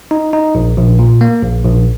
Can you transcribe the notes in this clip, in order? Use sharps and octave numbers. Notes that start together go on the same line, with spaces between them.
D#4
D#4
A#1
A#1
A#2
A#3
A#1
A#1